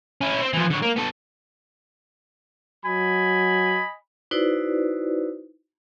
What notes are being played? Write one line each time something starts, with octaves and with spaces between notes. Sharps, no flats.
C#4 E4
C4
E3 F3
D3 C#5
A#3
B3 A4
F#3 D#5 G#5 B5
D#4 E4 F#4 B4 C5 D5